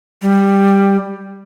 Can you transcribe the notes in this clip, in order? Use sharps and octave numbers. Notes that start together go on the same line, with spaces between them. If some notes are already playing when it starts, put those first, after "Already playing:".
G3